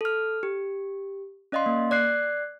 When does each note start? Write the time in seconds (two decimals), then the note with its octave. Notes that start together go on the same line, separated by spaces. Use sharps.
0.01 A4 F6
0.43 G4
1.52 C#4 D5 D#5 F5 C6
1.66 A#3
1.91 D5 F#6 C7